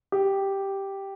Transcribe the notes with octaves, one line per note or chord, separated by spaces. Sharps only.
G4